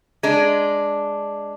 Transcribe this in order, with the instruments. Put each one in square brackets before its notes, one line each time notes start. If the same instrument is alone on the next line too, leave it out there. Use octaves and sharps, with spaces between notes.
[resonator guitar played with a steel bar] G#3 D4